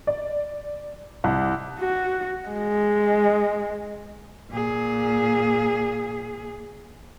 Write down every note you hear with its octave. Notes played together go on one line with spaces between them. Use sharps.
D5
C2
F#4
G#3
A#2 G#4